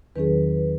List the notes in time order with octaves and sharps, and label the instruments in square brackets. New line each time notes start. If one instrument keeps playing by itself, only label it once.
[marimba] E2 D#3 F#3 C#4 G#4 [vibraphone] B4